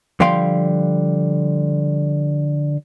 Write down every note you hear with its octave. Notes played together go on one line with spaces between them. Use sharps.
D3 F3 G3 F5 G5 C6